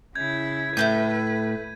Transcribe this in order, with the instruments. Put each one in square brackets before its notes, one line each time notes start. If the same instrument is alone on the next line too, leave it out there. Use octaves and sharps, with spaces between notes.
[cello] C#3 E4 [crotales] G6 G#6
[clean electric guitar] A2 [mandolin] A3 C4 G6 [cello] B4 [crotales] D#7